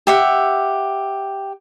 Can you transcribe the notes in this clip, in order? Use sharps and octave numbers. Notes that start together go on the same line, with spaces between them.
G4 E5 F#5